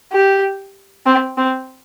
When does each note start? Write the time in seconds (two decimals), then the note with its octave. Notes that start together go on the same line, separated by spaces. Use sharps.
0.12 G4
1.06 C4
1.37 C4